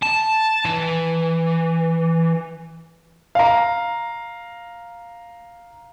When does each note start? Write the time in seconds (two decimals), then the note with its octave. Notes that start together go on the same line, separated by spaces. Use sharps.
0.03 A5
0.65 E3
3.35 F5 A#5